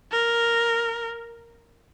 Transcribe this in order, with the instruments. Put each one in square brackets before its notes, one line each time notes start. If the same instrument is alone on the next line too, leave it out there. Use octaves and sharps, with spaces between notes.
[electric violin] A#4